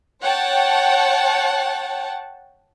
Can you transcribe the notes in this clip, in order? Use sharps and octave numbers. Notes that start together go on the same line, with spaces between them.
C#5 F#5 G5 A5